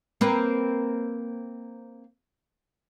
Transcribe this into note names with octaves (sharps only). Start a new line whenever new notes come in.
A#3 C4 B4